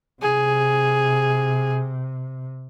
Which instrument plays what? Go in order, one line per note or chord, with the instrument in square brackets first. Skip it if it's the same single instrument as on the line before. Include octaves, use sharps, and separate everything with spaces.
[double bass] C3 [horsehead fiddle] G#4